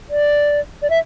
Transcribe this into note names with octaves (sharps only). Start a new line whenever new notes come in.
D5
D5
E5